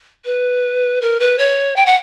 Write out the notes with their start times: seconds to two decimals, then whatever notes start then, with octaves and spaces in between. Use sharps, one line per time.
0.25 B4
1.01 A#4
1.20 B4
1.38 C#5
1.76 G5
1.86 F#5